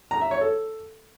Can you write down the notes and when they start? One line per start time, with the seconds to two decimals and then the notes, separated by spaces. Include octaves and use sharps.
0.11 A#5
0.21 E5
0.31 C#5
0.41 A4